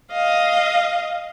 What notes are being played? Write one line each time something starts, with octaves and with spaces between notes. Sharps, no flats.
D#5 F5